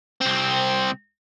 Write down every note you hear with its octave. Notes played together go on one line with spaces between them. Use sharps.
C2 C4